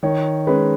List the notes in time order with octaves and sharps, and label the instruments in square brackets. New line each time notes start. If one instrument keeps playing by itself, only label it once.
[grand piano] D#3 C#5
G#3 C#4 B4